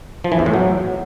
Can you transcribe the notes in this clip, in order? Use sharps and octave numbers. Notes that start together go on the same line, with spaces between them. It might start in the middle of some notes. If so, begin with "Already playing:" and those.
F3
E3
E2
A2
F#3